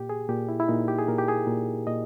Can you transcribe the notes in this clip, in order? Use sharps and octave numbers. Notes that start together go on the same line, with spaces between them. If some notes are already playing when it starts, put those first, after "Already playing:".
Already playing: A#2 G4
G#4
A#2 G4
E4
E4
A#2 D#4
G4
G#4
A#2 A#4
G4
G#4
A#2
A#2 D#5